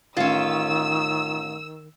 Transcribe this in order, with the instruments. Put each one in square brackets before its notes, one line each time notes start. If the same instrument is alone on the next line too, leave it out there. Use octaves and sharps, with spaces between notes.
[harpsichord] A1 [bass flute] D#3 [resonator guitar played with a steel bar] C#4 F4 [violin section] E6